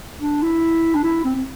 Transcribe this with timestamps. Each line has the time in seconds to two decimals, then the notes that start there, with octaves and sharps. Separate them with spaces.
0.21 D4
0.42 E4
0.95 D4
1.04 E4
1.24 C4
1.35 C4